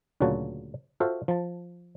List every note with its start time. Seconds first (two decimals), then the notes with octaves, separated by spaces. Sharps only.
0.20 D2 A#2 C#3 F#3 F#4 A5
1.00 F4 F#4 A4 C5 E5 F5
1.28 F3 A5